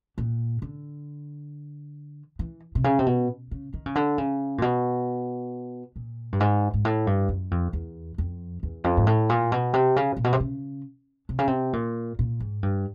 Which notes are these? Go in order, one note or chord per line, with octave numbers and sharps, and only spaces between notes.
A#2
D3
E3
C3
C#3
C3
B2
C#3
D#3
C#3
D3
C#3
A#2
B2
A#2
G2
G#2
G#2
A2
G2
F#2
F2
E2
F2
E2
F2
G#2
A2
A#2
B2
C3
C#3
A#2
B2
C3
C#3
C3
C#3
C3
A#2
A#2
G#2
G2